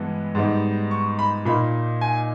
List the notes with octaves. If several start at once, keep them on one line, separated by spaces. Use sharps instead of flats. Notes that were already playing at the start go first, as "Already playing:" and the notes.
Already playing: G2 E3 G#3 B3 E4
G#2 G3 B3 D#4
C#6
B5
A#2 A#3 D#4 B5
G#5